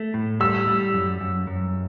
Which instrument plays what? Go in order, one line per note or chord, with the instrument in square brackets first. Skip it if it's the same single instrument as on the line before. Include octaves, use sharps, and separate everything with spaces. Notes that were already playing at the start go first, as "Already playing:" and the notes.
Already playing: [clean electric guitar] A3
A2
[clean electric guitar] G3 [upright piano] E6
[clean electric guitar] G3
F#2
F#2
F#2